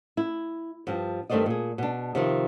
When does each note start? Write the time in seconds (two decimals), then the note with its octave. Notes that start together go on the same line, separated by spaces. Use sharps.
0.17 E4
0.87 G2 F3
1.30 G2 D#3 A3 C5 D5 D#5
1.46 A#2 G#4
1.78 B2 D4
2.15 C3 D#3 F3